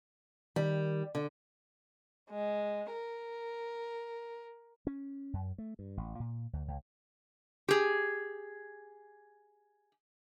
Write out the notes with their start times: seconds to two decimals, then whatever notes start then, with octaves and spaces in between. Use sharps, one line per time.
0.56 D#3 G3
1.15 D3
2.30 G#3
2.92 A#4
4.87 C#4
5.33 F#2
5.58 A3
5.79 G2
5.97 A1
6.20 A#2
6.53 D2
6.68 C#2
7.69 G4 G#4